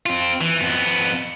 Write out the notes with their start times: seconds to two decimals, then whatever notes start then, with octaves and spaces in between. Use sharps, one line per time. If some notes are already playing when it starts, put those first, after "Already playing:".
0.06 C4 F4
0.41 E3
0.61 F2 B3